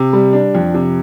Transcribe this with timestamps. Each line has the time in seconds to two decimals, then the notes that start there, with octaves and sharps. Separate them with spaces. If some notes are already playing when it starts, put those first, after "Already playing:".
Already playing: C3
0.13 G3
0.33 D4
0.55 F2
0.74 C3